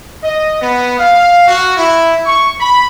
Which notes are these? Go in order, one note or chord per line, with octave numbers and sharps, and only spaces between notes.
D#5
B3
F5
F#4
E4
C#6
B5